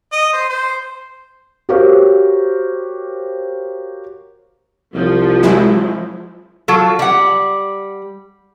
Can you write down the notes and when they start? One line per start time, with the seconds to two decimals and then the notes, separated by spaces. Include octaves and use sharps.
0.12 D#5
0.33 C5
0.49 C5
1.69 F#4 G4 A#4 C5 C#5 F5
4.94 C2 F3
5.43 F#3 G#3 E4
6.68 F#3 F4 A4
6.99 G3 F#5